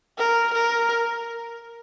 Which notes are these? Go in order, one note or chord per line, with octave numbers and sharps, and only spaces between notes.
A#4
A#4